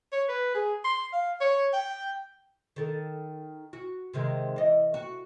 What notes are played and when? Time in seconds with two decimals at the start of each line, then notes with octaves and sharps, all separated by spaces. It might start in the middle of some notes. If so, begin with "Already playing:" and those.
0.12 C#5
0.28 B4
0.54 G#4
0.84 C6
1.13 F5
1.41 C#5
1.73 G5
2.76 D#3 A4
3.73 F#4
4.13 C3 D#3 G#3
4.56 E3 D#5
4.94 F#4